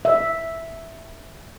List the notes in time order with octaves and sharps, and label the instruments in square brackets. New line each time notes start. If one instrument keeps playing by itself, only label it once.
[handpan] E5